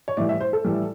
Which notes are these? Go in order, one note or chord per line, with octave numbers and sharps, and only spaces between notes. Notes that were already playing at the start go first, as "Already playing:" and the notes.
C#5
A2 E3 G3 D5
E5
C5
A4
A2 E3 G3